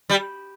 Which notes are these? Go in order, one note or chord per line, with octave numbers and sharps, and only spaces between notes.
G3